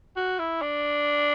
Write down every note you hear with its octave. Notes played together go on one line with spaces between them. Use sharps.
F#4
E4
D4